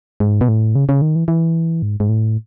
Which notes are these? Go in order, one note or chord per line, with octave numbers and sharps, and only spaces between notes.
G#2
B2
A2
C#3
C#3
D#3
E3
E3
G#2
G#2
A2